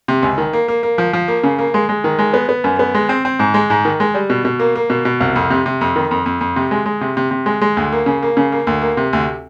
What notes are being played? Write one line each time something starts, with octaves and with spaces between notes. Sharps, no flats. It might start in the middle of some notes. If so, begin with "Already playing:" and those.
C3
C#2
D#3
A#3
A#3
A#3
F3
F3
A#3
C#3
A#3
G#3
G#3
D#3
G#3
B3
B3
F#2
B3
G#3
C4
C4
G#2
G#3
G#2
D#3
G#3
G3
B2
B2
A#3
A#3
B2
B2
C2
F2
C3
C3
F2
D#3
F2
F2
F2
C3
G#3
G#3
C3
C3
C3
G#3
G#3
D2
A#3
C#3
A#3
C#3
A#3
D2
A#3
C3
D2